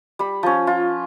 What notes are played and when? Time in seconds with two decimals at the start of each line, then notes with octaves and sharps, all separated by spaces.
0.19 G3 B5
0.43 F3 C#4
0.67 F4